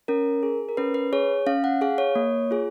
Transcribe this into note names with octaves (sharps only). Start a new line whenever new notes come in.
C#4 A#4
G#4
A#4
C#4 B4
B4
G#4 C#5
C#4 F5
F#5
G#4 F5
C#5
A#3
F4 G#4